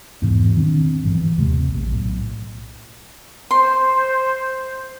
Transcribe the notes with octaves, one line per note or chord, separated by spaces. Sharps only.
E2 G#2 B2 E3
D#3 C4 D4
G1 G2 B2 E3
D#2 C3 A3
A#1
B1 A2
C5 C6